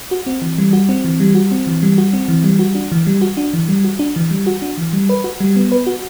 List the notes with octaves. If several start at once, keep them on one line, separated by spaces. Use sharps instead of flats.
F#4
C4
E3
G3
F#4
C4
E3
G3
F#4
C4
E3
G3
F#4
C4
E3
G3
F#4
D4
E3
G3
F#4
D4
E3
G3
F#4
D4
E3
G3
F#4
D4
E3
G3
B4
F#4
G3
B3
B4
F#4